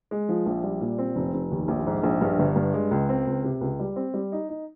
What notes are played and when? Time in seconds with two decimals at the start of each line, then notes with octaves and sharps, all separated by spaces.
0.11 G#3
0.29 F3
0.46 A#1
0.64 G3
0.81 A#2
0.98 C4
1.16 F1
1.34 F1
1.52 D#2
1.68 A#1
1.87 G#2
2.04 A#1
2.21 G2
2.39 G1
2.56 G2
2.74 G#3
2.91 C#2
3.09 C4
3.27 C#2
3.44 C3
3.61 C#2
3.79 G3
3.96 C4
4.14 G3
4.32 D#4
4.49 D#4